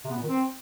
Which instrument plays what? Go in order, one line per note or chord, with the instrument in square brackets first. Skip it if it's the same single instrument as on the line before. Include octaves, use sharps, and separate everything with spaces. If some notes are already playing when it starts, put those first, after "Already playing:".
[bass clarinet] C3
B3
A#2
D#3
C4